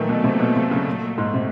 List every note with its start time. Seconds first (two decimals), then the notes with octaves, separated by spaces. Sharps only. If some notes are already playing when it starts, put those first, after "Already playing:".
Already playing: A#2 D#3 E3 F#3 A3
0.09 B2
0.24 C3
0.40 B2
0.56 C3
0.71 C#3
1.18 G#2
1.34 C3